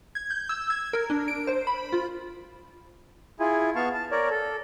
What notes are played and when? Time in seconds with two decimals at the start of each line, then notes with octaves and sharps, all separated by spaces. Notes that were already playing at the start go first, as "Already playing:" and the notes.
0.15 G#6
0.31 G6
0.49 E6
0.70 G#6
0.93 A#4
1.10 D4
1.28 D7
1.47 C5
1.67 B5
1.93 F4
3.40 E4 F4 G#4 G#5
3.75 B3 F5 A5 C#6
3.94 A5
4.11 A#4 C#5 D5
4.30 A4